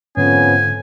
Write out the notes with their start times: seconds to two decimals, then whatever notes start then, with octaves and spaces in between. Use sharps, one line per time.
0.17 F2 G#2 D3 B3 C#4 G#5